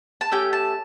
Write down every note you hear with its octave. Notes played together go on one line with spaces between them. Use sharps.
A5
A3 C#4 G4 G5
A5